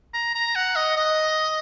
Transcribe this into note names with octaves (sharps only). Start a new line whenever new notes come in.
A#5
A#5
F#5
D#5
D#5